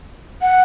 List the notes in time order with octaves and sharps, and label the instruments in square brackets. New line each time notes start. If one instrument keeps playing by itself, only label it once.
[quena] F#5